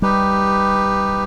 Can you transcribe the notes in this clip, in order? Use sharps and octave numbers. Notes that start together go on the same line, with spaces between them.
G3 D#4 G4 B4